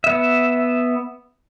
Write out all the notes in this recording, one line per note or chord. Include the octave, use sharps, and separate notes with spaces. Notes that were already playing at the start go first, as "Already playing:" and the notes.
B3 E5